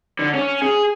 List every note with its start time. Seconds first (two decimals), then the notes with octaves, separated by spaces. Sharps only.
0.19 D3
0.34 C#4
0.62 G#4